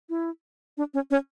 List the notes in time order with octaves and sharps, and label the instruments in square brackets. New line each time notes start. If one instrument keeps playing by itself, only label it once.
[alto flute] E4
D4
C#4
C#4